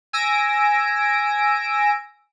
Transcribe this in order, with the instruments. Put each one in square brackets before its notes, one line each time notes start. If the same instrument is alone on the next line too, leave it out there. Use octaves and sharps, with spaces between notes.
[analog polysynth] G#5 E6 A#6 D7